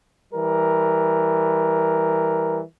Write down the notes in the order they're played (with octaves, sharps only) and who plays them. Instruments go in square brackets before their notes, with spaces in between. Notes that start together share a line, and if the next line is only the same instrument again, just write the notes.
[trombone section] E3 G3 A#4